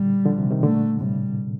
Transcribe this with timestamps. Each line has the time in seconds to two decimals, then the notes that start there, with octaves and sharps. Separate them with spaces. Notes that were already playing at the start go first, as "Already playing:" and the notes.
Already playing: A#2 D3 G3
0.25 D3 F3
0.38 C3 D#3
0.51 C3 D#3
0.63 A#2 D3 A3
1.01 A2 C3 G3